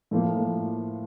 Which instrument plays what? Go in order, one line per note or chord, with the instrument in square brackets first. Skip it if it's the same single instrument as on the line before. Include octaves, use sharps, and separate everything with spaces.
[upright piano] A2 F3 A#3